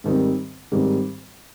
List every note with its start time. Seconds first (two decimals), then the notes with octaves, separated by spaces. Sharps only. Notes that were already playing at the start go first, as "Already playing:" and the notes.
0.04 G#2 D#3 G3 C4
0.72 G#2 D#3 G3 C4